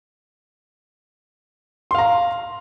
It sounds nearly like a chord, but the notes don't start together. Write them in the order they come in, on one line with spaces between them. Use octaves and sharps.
C6 F5 A#5